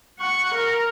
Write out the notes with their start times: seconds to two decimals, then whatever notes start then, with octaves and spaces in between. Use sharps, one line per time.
0.19 F#5 C#6
0.54 A#4